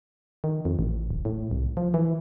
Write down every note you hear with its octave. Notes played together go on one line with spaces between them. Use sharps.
D#3
F2
A1
D1
A2
C2
F3
E3